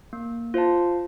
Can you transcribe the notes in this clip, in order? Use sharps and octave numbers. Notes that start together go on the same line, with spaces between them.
A#3
F4 C5 F5 A5